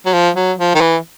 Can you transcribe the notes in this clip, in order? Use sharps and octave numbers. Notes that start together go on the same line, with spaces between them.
F#3
F3
F#3
F3
D#3
E3